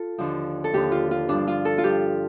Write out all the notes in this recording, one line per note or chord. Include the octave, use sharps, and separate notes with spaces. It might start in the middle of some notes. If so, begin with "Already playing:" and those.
Already playing: F4 A4
D#2 D3 F3
A4
D#2 D3 F3 G4
F4
F4
G2 F3 D4
F4
A4
F4
G2 F3 G4